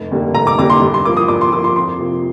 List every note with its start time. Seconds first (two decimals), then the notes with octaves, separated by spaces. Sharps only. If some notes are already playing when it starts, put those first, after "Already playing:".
Already playing: F1
0.11 D#2 D3 G3 A#3
0.35 F1 A#5
0.47 D6
0.58 D#2 D3 G3 A#3 D6
0.70 C6
0.82 G2
0.94 C6
1.05 F3 A#3 D6
1.17 D#6
1.28 G2 D6
1.41 C6
1.52 F3 D6
1.56 A#3
1.64 C6
1.76 F2 C6
1.99 C3 F3 A#3